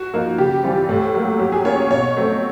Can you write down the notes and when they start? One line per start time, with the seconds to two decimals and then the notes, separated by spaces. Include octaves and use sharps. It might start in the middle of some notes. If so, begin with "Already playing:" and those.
Already playing: F#4
0.14 F3 A#3 D#4
0.38 C#3 G4
0.63 E3 G3 C4 F4
0.89 A2
1.14 F#3 A#3
1.39 F#3 G4
1.52 G#4
1.65 A#3 C#4 F4 C#5
1.90 B2 C#5
2.17 F#3 A3 C4